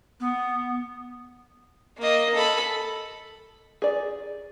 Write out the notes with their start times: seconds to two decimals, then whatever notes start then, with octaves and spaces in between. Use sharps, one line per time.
0.20 B3
1.98 A#3 D#5
2.35 A4 B5
3.82 G#4 D5